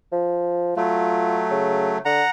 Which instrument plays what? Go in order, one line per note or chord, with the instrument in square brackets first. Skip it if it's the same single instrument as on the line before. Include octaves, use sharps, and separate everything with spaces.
[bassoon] F3
[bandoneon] F#3 A3 [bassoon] F4
[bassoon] C#3
[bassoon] D3 [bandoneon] F#5 A#5